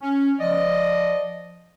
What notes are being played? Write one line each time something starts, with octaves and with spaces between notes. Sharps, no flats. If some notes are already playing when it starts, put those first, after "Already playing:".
C#4
F3 D5 D#5